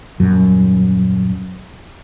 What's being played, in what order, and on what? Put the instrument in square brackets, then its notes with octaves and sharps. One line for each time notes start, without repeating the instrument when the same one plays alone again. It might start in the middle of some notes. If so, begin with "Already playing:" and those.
[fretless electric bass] D#1 F#2